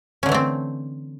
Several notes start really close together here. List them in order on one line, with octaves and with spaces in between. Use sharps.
C#4 D3 E3 A3 C4